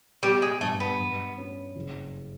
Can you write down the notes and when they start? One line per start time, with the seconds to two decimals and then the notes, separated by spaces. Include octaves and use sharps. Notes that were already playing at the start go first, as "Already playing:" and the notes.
0.23 G3 B3
0.42 G#3
0.61 G2 A3
0.80 B3
1.00 G2
1.38 C#4
1.76 F#1